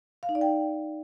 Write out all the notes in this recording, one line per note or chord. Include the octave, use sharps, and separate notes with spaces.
F5
D#4
D5
G5